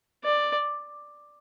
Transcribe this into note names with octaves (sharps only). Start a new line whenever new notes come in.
D5